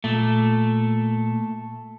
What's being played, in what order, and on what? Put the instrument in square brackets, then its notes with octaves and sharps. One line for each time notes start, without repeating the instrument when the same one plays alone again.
[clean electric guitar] A#2 [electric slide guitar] A3